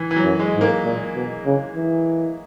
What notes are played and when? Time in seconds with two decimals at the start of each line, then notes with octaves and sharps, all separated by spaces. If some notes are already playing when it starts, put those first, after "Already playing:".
Already playing: E3
0.11 E3
0.16 F#3
0.24 F#2
0.39 G#3
0.55 G#2
0.61 A#3
0.84 A#2
1.15 B2
1.45 C#3
1.75 E3